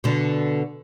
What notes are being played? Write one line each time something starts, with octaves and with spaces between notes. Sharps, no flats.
B2 D3